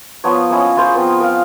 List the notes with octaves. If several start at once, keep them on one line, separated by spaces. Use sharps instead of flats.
F3 B3 C#5
A#3 C#4 E4 D#5
E4 F4 G#4 C5
F3 B3 C4 A#4
A#4 F5